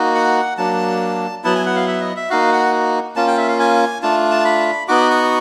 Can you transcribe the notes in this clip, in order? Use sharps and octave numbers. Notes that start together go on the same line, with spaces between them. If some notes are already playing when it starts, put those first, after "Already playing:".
Already playing: A#3 D#4 F#4
F#5
F#3 A#3 D4 A5
F#3 B3 E4 A5
G#5
F#5
F5
E5
D#5
E5
A#3 D#4 F#4 F5
F#5
A#3 C#4 F4 A5
G5
E5
F5
G#5
A3 D4 F4 A5
A5
B5
B3 D#4 F#4 D6
C#6